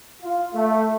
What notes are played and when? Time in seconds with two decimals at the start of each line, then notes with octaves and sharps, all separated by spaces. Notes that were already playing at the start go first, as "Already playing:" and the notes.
0.22 F4
0.54 A3